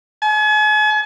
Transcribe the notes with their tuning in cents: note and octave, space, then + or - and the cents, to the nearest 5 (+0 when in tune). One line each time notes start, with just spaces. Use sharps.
G#5 +40